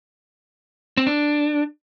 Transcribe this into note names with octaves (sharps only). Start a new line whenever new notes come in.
C4
D4